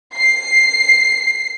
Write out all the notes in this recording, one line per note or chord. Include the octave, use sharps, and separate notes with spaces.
C7